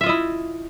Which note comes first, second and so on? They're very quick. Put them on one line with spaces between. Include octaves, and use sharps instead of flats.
E5 F4 D#5 E4